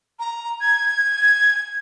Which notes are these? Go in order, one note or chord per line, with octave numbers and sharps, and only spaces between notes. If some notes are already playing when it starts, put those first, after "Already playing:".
A#5
G#6